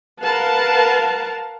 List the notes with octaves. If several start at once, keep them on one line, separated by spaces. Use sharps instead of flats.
A#4 B4 F5 F#5 A5